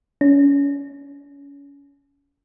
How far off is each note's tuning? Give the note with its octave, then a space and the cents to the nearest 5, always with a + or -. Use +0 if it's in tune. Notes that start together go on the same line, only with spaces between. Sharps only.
C#4 +30